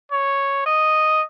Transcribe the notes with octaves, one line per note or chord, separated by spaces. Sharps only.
C#5
D#5